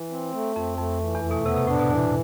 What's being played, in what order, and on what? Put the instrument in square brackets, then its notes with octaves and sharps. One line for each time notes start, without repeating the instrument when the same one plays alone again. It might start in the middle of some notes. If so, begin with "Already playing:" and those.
Already playing: [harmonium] E3
C4
A3
[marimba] F2 [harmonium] C4
[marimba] F2 [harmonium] A3
[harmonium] E3
[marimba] E2
[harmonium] A3
[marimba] B2
[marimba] C3 [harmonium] B3
[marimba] C3
[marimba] A2 [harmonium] D4
[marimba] B2
[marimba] B2 [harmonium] E3